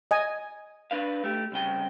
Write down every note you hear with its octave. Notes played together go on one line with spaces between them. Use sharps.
D#5 G#5
D4 B4 F5
A3 G4
C2 C#3 G5